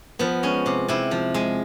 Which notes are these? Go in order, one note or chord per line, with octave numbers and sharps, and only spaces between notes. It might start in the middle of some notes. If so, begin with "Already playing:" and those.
F3 B3
G#3 C#4
C3
C3 E4
F3
G#3